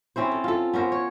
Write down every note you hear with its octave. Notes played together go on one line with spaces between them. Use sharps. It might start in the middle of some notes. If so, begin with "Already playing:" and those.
C4 C#4 E4 C5
A4
F4 A4
B3 C#4 A#4 C5
C#5